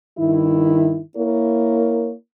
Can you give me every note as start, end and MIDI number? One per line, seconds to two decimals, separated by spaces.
0.18 1.00 43
0.18 1.00 51
0.18 1.00 64
1.16 2.13 58
1.16 2.13 64
1.16 2.13 70
1.16 2.13 73